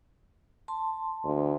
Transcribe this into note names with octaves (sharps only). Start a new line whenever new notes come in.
A5 C6
D2